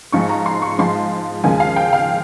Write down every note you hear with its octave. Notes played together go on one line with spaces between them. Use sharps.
G#2 F3 G#3 C#6
A#5
C6
C#6
G#2 F3 G#3 C6
D#2 C#3 F3 G#3 G#5
F5
G5
F5